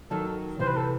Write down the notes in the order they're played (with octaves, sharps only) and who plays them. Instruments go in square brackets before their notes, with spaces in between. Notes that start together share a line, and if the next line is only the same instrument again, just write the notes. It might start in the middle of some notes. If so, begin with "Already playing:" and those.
[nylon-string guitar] D#3 F#3 [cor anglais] A4
[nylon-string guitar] C3 E3 [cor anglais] C5
[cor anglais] B4
A4